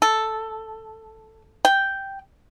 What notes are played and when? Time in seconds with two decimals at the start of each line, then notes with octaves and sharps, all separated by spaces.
0.02 A4
1.65 G5